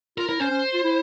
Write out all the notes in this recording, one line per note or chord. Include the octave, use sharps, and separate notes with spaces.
F4 A#4
E4 A#4
C#4 C5
C#4
F4
E4